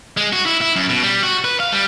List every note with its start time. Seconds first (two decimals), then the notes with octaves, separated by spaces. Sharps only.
0.17 G#3
0.33 F#4
0.46 E4
0.61 E4
0.76 F#2
0.89 B2
1.03 G3
1.23 F#4
1.44 B4
1.60 F5
1.72 G3